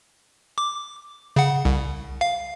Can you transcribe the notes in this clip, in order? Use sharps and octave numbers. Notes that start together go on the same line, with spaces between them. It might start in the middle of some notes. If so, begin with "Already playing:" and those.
D6
C#3 F#5
C2
F5